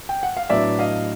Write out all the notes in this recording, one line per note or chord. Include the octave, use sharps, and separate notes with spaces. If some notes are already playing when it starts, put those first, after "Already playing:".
G5
F#5
F5
A2 F#3 B3 D4 D5 E5
D#5 F5